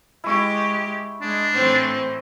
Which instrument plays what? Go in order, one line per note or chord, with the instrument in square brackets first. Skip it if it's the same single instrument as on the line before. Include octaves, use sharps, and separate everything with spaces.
[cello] G#3 G4 [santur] E4 C#6
[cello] G#3 [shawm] D4
[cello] A2 E3 [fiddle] C4 C5